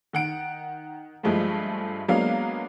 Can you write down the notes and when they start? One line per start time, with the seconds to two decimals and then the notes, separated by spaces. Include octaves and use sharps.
0.13 D#3 F#5 D7
1.23 G2 F3 G#3 A3
2.08 F#3 G#3 A#3 B3 D4 F5